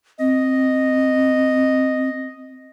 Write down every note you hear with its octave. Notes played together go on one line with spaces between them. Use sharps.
C4 D#5